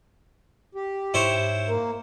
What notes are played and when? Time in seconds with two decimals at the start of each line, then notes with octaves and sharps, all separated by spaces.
0.75 G4
1.14 G#2 E4 C5 C#5
1.66 A#3